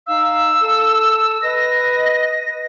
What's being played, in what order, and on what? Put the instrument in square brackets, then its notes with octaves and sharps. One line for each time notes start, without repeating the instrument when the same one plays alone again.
[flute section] D#4 F5 [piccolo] E6
[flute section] A4
[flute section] B4 D#5 [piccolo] A#6